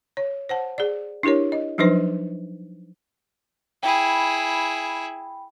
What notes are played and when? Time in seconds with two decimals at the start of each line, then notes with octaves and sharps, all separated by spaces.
0.17 C#5
0.49 C5 F#5 A5
0.78 G#4 D5
1.23 D4 E4 G4 A#4 C#5
1.52 D#5
1.78 F3 F#3 D4 D#4 B4 C5
3.83 E4 G#4 G5 B5